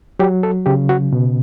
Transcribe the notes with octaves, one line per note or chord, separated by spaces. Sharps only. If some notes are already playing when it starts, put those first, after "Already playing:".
F#3 G4
A4
C#3 G4
F#4
B2